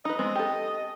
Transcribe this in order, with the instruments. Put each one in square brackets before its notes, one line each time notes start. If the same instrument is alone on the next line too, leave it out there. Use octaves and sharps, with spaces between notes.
[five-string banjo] D#4 B4 [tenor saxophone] D#5
[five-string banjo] G#3 B3 C4
G4 A4